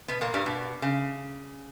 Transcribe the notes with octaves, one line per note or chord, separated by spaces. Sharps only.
B2 B3
A#2 A#3
G2 G3
B2
C#3